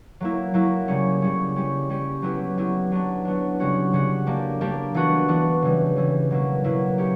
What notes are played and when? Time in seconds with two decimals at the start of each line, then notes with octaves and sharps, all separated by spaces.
0.20 F#3 A#3 E4
0.54 F#3 A#3 E4
0.88 C#3 G3 C#4
1.22 C#3 G3 C#4
1.56 G3 C#4 G4
1.90 G3 C#4 G4
2.22 F#3 B3 E4 G4
2.57 F#3 B3 E4 G4
2.92 F#3 B3 D4
3.25 F#3 B3 D4
3.60 C#3 G3 C#4 F#4
3.93 C#3 G3 C#4 F#4
4.27 G3 A#3 D4 G4
4.61 G3 A#3 D4 G4
4.94 E3 B3 D4 F#4
5.28 E3 B3 D4 F#4
5.62 C#3 E3 G3
5.96 C#3 E3 G3
6.31 B2 F#3 A#3 E4
6.64 B2 F#3 A#3 E4
6.98 A#3 C#4 G4